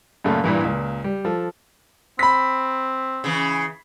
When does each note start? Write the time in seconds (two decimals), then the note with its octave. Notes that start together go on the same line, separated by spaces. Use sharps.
0.24 F#2 A#2 C#3 A3 A#3
0.44 G2 A#2 E3
0.62 C#2 A#2
1.04 G3
1.25 F3 A4
2.19 C4 B5 B6
3.24 C#3 E3